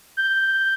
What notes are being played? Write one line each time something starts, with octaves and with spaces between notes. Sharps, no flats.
G6